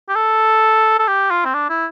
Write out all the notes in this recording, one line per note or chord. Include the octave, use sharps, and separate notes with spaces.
G4
A4
A4
G4
F4
C4
D4
E4